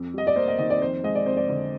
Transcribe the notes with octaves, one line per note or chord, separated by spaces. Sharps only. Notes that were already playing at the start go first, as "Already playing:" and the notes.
Already playing: F2
G3 D#5
D5
A#3 C5
D#5
D#3 D#5
D5
F2 C5
G#3 D#5
D5
F2 C5
D5
D3